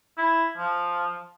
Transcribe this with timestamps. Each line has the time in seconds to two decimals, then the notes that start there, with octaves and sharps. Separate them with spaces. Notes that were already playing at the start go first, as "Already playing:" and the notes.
0.17 E4
0.58 F3